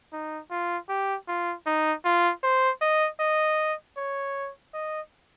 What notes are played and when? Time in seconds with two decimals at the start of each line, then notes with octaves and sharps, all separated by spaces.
0.13 D#4
0.51 F4
0.89 G4
1.28 F4
1.66 D#4
2.05 F4
2.43 C5
2.81 D#5
3.20 D#5
3.97 C#5
4.74 D#5